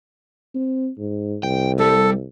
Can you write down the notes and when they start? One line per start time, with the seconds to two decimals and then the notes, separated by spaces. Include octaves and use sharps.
0.55 C4
0.98 G#2
1.43 C2 G5
1.79 G3 G4 A4